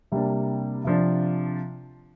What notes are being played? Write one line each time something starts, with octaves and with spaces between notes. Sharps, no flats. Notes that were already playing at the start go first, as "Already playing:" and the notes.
C3 G3 A#3 D4
C3 F3 D4